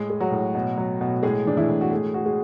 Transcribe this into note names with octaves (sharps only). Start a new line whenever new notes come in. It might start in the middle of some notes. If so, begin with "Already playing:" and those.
Already playing: A2 G#3 G#4
G#3
F#3 F#4
A2
B2
F#3
B2
A2 G#3 G#4
E3 D4
E3 E4
A2
F#4
G#3 A3 G#4
A3 F#4
G#3 G#4